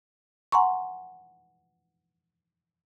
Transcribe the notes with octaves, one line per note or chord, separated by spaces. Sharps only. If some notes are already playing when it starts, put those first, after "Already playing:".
F#5 G#5 A#5 C6 C#6